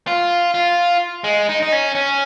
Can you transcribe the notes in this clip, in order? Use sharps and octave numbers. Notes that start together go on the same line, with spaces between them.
F4
F4
G#3
D#4
D#4
C#4
C#4